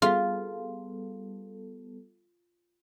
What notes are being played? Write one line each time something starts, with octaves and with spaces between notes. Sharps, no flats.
G3 B3 F4 G#4 A4 F5